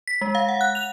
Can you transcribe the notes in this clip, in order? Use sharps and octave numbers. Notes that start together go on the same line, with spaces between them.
B6
G#3
F5
F#5
F#6
F7